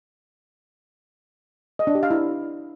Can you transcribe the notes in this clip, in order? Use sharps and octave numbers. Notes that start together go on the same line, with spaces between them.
D#5
D4
G4
F5
E4